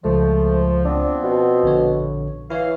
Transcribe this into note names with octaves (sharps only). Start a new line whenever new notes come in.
C#2 F3 G#3 A3
F3 B3 C4 D4
B2
A#1 D3 C#5
E3 E4 C#5 F5